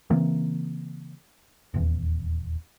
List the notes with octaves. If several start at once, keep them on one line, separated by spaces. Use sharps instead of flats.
C#3 E3 A#3 C4
D#1 E2